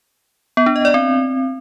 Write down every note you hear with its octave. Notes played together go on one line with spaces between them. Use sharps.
B3
D4
D#5
D5
C4